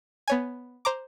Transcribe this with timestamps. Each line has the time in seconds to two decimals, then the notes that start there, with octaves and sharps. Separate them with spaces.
0.28 B3 C#5 G#5
0.85 C5 A#5 D6